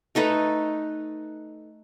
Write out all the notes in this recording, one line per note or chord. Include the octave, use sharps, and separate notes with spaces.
A3 D#4 A4 B4